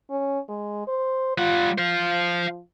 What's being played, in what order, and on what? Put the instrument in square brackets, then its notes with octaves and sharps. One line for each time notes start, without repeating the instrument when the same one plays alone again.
[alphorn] C#4
G#3
C5
[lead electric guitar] G3 F#5 [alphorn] F4
[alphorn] F3 [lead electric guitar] C5 F5